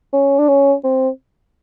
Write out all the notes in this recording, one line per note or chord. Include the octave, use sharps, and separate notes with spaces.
C#4
D4
C#4
C4